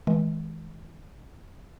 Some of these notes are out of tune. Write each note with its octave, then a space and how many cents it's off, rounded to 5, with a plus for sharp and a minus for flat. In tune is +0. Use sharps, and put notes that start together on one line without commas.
E3 -35 G#3 +25